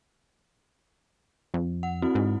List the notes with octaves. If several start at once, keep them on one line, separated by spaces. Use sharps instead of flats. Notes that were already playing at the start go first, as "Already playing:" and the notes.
F2
F#5
C4 E4 F#4
G#2